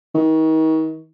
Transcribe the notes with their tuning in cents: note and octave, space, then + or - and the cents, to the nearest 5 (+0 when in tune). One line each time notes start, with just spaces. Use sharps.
D#3 +35